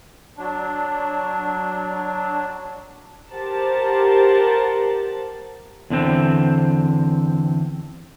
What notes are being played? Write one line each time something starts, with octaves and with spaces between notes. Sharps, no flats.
F#3 D4
G4 A#4 C5 F#5 A5
E2 D3 C4